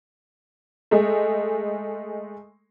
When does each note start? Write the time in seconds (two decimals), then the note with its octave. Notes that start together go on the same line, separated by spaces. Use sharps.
0.91 G#3 A3